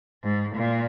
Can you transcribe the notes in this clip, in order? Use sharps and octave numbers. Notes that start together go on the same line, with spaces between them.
G#2
A#2